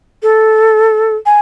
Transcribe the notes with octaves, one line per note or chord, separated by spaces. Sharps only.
A4
G#5